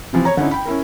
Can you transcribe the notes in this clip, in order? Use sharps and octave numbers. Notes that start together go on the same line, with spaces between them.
C3 E3 F3 C4
C#5 A#5
D3 C#4 D#4 E4
G5 B5
C#4 E4 A#4